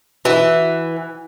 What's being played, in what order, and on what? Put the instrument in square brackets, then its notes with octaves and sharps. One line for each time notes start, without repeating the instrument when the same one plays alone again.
[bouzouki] E3 [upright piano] F#4